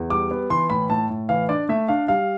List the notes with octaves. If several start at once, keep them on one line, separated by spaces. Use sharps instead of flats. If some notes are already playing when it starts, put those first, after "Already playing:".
Already playing: E2
G3 D6
B3
E3 C6
A2 B5
A2 A5
A2
E3 F5
D4 D5
A3 E5
D4 F5
G3 F5